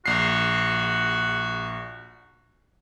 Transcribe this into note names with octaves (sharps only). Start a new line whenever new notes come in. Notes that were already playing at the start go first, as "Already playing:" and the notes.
A#1 F#4 C7